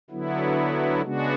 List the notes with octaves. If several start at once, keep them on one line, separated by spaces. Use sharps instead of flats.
D3 F#3 B3 E4
C#3 G#3 B3 D4 F#4